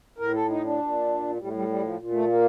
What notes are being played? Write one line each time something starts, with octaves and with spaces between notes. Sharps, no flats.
A2 A#4
A4
D#4
D4
A#2
A2 G3
A3
G3
G3
F3
A#2
A3
A#3